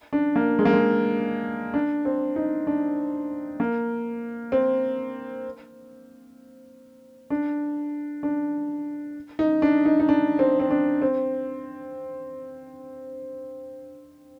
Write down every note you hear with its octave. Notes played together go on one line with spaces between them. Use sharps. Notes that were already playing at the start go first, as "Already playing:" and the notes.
D4
A#3
G#3
A#3
G#3
D4
C4
D#4
D4
A#3
C4
D4
D4
D#4
D4
D#4
D#4
D4
C4
C4
D4
C4